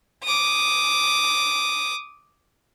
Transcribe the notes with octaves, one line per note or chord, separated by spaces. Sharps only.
D6 D#6